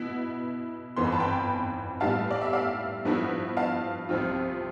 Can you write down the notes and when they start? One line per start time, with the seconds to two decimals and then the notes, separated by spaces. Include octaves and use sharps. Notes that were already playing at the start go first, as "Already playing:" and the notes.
Already playing: B2 B3 E4
0.96 G1 F2 E3 B3 C6
1.04 B5
1.12 A5
1.20 G5 B5
2.00 A1 A2 G3 B3 F5 A5
2.31 D5
2.41 E5
2.53 D5 F5
3.05 G2 F3 B3 E4
3.57 F5 A5
4.09 C2 C3 F3 C4 F4